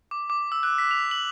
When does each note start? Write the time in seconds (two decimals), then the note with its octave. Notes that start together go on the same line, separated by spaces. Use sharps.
0.11 D6
0.30 D6
0.52 E6
0.63 F#6
0.78 B6
0.91 F7
1.11 F#7